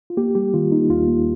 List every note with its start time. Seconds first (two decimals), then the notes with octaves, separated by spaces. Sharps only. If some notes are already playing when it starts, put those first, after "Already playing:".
0.10 F4
0.17 A#3 G4
0.35 G3 G4
0.54 D#3 F4
0.72 A#3 D#4
0.90 D#2 F4
1.08 A#3